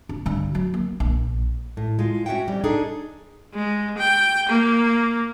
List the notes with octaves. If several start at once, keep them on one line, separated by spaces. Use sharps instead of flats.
D4
G2 D3
F#3
A#3
A#1
A2
G#3 F4
C#4 F#4 E5 F#5 G5
F2 G3
D4 D#4 G#4 A4
G#3
G5
A#3